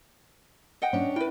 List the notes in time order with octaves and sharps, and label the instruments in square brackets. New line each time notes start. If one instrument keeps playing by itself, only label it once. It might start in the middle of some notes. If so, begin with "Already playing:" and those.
[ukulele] D#5 F#5 G5
[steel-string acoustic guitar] C#4 D4
[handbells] E4 [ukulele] B4 G5